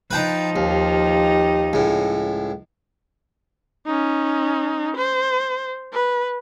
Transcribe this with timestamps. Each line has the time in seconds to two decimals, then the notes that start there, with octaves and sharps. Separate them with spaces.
0.11 F3 D#4 B4 G5 A5
0.56 D#2 G4
1.73 C#2 A2
3.86 C#4 D#4
4.97 C5
5.93 B4